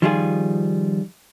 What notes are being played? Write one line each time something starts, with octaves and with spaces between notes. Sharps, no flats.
D#3 F3 G3 E4 F4 G#4